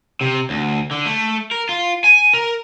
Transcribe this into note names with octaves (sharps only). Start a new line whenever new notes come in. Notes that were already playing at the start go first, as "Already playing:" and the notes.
C3
D2
D3
A3
A#4
F4
G#5
A#4